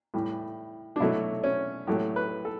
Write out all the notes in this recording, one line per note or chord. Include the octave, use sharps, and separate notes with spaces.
A2 E3 G3
D4
B2 F#3 A3 E4
C#4
A2 F#3 A3 G4
B4
A4